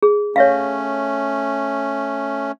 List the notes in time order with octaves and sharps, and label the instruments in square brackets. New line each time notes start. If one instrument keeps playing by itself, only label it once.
[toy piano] G#4
[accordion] A3 C#4 [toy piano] C#5 E5 F5